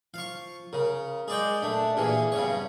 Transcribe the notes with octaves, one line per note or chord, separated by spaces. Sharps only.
F3 F5 C#6
C#3 A#4
G#3 G#4 D5 G5
A#2 A3 D4 E5
A#2 E3 G4 G#4
G2 C#3 B3 C#4 C#5